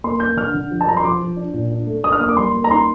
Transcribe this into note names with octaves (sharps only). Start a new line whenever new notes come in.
A#3 C6
A#3 G6
D3 F6
D3
F3
A5
F3 A#5
C6
F3 D6
F3
D4
A#2
D4
A3
D4 D#6
F6
A#3 D#6
D6
G3 C6
A#3
A#5
D#4 C6